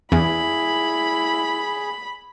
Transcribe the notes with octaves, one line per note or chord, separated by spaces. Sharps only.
E2 E4 G#4 B5